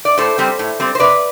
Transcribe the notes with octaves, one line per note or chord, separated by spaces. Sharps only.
D5
A2 A4 C5
G3 C4
A2
G3 C4
C5
C3 B4 D5